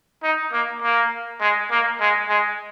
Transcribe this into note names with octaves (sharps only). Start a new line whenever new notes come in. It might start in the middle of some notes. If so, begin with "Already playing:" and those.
D#4
A#3
A#3
G#3
A#3
G#3
G#3